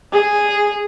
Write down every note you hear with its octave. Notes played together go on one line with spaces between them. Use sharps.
G#4